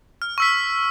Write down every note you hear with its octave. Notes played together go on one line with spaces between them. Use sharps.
F6
C#6 E6 B6